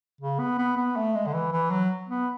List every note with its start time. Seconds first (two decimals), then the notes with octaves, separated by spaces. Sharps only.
0.21 C#3
0.39 B3
0.58 B3
0.77 B3
0.96 A3
1.15 G#3
1.27 D3
1.33 E3
1.52 E3
1.71 F#3
2.09 B3